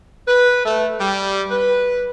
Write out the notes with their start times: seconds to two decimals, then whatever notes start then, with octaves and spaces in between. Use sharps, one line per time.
0.28 B4
0.66 A3
1.00 G3
1.51 B4